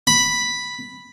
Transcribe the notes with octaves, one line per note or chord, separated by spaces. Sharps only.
B5